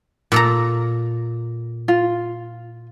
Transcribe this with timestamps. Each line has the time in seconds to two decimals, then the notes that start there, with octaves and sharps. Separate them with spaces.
0.32 A#2 A4 A#5
1.88 F4